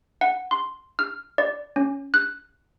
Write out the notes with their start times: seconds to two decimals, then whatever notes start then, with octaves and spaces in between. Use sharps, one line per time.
0.21 F#5
0.51 C6
0.99 F6
1.38 D5
1.76 C#4
2.14 F#6